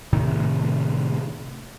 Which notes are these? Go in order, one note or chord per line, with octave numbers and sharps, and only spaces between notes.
A2 C3 D#3